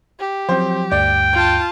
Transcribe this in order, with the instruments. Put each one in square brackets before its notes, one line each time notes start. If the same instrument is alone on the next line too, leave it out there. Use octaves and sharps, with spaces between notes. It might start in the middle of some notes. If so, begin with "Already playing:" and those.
[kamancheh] G4
[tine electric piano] F3 F#3 [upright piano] C4 C5
[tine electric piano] D2 G2 [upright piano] D5 [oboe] G5
[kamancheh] F4 A5 [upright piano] G6